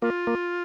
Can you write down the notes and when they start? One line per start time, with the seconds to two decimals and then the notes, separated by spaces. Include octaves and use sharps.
0.02 A#3 F4
0.27 A#3